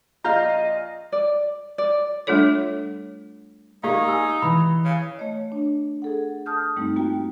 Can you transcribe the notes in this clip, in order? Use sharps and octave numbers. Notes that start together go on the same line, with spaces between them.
A#1 F4 D#5 F5 A#5 G6
D5
D5
G3 A3 D4 F4 A4 C#5
A#3 D#4 G4 D5 F5
G#5 E6
E3 B5
C#3
A3 C#5 D#5
D4
G#4 A4 F#5
A5 D#6 F6 G6
G2 G3 A3 C4 D#4
A#3 F4 F#4 G5